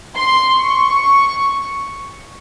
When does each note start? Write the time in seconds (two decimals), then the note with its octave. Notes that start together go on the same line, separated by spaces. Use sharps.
0.15 C6
0.58 C#6